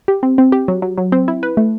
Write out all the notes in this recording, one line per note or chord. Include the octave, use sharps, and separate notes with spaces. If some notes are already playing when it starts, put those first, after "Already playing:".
G4
C4
C4
G4
F#3
F#3
F#3
C4
E4
B4
A3